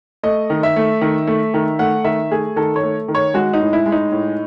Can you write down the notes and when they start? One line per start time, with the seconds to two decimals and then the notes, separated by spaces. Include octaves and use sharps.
0.23 A3 D#5
0.50 D#3
0.63 E5
0.76 A3
1.01 D#3
1.27 A3
1.54 D#3
1.79 A3 F#5
2.05 D#3 E5
2.31 A3 G#4
2.56 D#3 A4
2.76 C#5
2.83 A3
3.08 D#3
3.15 C#5
3.34 G#3 F#4
3.54 D#4
3.60 A2
3.73 E4
3.86 G#3
3.92 D#4
4.12 A2